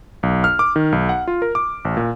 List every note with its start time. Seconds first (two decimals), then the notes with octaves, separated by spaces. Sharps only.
0.23 B1
0.44 F6
0.59 D6
0.76 D#3
0.92 B1
1.09 F#5
1.28 F4
1.42 A#4
1.55 D6
1.85 A1
1.97 A#2